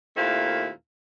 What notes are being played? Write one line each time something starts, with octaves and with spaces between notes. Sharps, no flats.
D#2 A#2 A3 C4 E4 F5